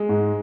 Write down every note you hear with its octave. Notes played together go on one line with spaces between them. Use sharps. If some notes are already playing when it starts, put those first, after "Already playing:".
Already playing: G#3
G#2